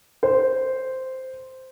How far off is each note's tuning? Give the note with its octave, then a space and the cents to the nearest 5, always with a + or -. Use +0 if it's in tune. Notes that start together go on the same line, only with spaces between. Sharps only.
C5 -5